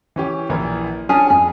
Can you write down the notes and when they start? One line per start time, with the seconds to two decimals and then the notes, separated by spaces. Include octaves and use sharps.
0.16 E3 C#4 G4
0.49 A#1 E3 A#4
1.09 C#4 D4 G#4 G#5 A5 F6
1.30 F2 G#4